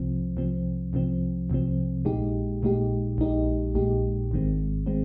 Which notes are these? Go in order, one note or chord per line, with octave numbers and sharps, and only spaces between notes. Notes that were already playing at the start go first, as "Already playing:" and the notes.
Already playing: C2 C3 F3 C4
C2 C3 F3 C4
C2 C3 F3 C4
C2 C3 F3 C4
A#1 A#2 G#3 D#4 G4
A#1 A#2 G#3 D#4 G4
A#1 A#2 G#3 D#4 G4
A#1 A#2 G#3 D#4 G4
G#1 G#2 D#3 G#3 C4
D#3 G#3 C4